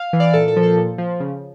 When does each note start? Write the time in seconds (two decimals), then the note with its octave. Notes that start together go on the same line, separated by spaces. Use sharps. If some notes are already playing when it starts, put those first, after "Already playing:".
Already playing: F5
0.13 E3
0.20 D5 F5
0.34 A#2 A4
0.48 A4
0.56 F3
0.63 A4
0.77 A#2
0.98 F3
1.20 C#3